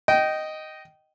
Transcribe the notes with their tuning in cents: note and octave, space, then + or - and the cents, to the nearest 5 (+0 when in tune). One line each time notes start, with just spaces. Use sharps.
D#5 +0 G5 -20